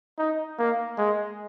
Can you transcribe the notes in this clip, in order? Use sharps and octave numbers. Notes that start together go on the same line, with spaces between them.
D#4
A#3
G#3